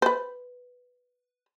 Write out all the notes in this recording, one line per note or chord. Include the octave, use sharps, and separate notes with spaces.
B4 C5